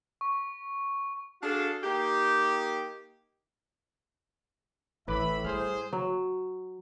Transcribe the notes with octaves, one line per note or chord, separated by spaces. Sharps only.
C#6
D4 F#4 G#4 A4 F5
A#3 D#4 G4
A1 A2 E3 B4 E5 B5 D6
G3 G#4 C5 F6
F#3